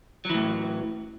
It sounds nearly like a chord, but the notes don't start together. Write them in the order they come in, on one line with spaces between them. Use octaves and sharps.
F#3 E3 A2